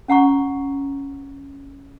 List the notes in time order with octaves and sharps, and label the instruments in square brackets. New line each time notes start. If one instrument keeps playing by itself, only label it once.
[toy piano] C#4 F#5 A#5 C#6